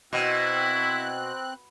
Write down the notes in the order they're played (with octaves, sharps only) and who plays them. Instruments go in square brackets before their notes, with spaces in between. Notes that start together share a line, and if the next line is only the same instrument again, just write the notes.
[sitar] B2 [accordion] C4 F#6 [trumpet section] E4